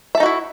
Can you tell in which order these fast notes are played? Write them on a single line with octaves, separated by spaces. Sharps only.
E5 A4 D#4 F#4 E4